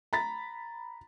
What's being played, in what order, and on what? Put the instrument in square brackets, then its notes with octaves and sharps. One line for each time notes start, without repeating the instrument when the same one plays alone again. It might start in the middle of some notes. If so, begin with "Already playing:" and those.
[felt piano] A#5 B5 A6 B6